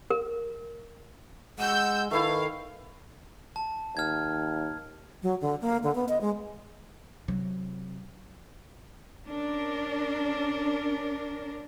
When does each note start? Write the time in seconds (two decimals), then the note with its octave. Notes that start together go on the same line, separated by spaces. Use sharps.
0.10 A#4
1.59 G#3 F#5 E6 G6
2.11 D#3 A3 E4 B4 F5
3.56 A5
3.97 D#2 F6 G#6
5.23 F#3
5.41 D3
5.61 A#3
5.83 D3
5.95 B3
6.08 D#5
6.21 G#3
7.28 C3 F#3
9.26 C#4 D4 A#4